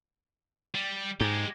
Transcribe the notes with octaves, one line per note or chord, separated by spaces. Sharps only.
G3
G#2 G#3 G4